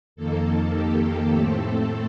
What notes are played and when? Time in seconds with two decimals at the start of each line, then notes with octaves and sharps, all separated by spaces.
0.16 F2 D#3 A#3 A4
0.73 G4
1.30 A2 A3 C4 A4